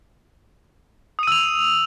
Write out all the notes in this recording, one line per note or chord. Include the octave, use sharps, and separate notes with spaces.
D#6 E6 D#7 F7